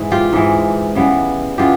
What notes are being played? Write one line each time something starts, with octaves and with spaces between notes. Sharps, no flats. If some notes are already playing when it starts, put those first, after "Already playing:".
Already playing: G#2 E3 G#3
F4 G4
G#2 E3 G#3
C#3 E3 G3 B3
C#3 E3 G3 B3 F4 G4